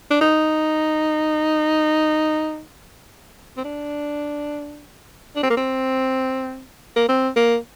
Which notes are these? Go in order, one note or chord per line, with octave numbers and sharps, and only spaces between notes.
D4
D#4
C4
D4
D4
C4
A#3
C4
A#3
C4
A#3